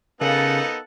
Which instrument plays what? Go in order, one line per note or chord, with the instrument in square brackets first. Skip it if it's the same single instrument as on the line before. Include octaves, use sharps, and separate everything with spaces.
[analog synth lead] C#3 [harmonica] B3 D#4 A4 [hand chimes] A#4 F5 [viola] F#5 A5